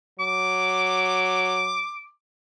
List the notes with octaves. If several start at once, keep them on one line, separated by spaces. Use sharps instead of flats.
F#3 D6